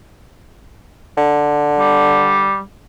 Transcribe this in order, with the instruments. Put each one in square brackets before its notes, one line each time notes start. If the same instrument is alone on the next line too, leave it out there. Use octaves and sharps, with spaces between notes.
[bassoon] D3
[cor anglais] G3